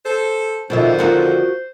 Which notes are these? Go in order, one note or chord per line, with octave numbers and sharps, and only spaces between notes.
A4 C5
F2 B2 D3 D#3 F4 C5 E5
F4 F#4 A#4